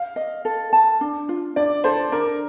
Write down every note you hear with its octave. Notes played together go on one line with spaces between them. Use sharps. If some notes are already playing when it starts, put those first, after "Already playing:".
Already playing: F5
D#5
A4
A5
D4
F4
D4 D5
A4 C5
D4 A#4